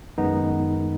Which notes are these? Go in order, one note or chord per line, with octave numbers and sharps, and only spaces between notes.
F#2 D#3 G#3 B3 D#4